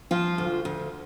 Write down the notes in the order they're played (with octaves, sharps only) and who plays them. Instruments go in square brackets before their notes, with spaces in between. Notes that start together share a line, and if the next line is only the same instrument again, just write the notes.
[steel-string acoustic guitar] F3 F4
D2
D2